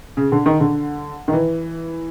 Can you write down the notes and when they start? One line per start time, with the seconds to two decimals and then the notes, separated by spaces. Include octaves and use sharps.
0.17 C#3
0.32 D3
0.46 D#3
0.60 D3
1.28 D#3
1.33 E3